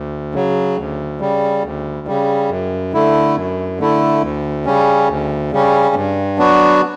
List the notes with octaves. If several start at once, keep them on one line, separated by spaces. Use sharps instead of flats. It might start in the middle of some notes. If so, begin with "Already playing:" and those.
Already playing: D2
C#3 F#3
D2
C#3 G3
D2
C#3 G3
F#2
D3 A3 E4
F#2
D3 A3 E4
D2
C#3 G3 C#4
D2
C#3 G3 C#4
G2
F#3 B3 D4 F#4